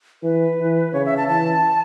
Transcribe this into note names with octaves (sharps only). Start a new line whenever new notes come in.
E3 B4
E3
C#3 C#5
E5
A5
E3 A5